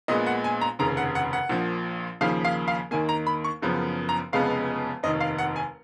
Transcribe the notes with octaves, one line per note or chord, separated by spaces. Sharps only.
A#1 A#2 G#3 B3 D#5
F#5
G#5
A#5
F1 D#2 C#3 A#5
F#5
F#5
F#5
A#1 A#2 F3
D#2 C#3 F3 A#3 F5
F5
F5
D#2 D#3 A#3 G#5
A#5
B5
C#6
F#1 F#2 C#3 F3 B3
A#5
F1 F2 C#3 G#3 B3 F5
F1 D#2 D#3 D#5
F5
F#5
G#5